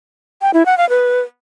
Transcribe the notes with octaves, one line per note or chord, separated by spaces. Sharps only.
G5
E4
F#5
F5
B4